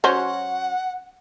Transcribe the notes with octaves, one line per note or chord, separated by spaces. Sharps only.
F#3 C#4 C5 F#5